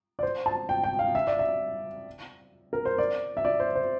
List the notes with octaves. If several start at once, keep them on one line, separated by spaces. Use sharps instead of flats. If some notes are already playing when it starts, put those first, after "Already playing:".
D5
C5
A5
G5
G5
F5
E5
D5
E5
A#4
C5
D5
E5
D5
C5
C5